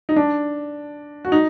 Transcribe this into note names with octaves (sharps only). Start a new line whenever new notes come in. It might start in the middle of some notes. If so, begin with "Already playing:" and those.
D#4
D4
F#4
D#4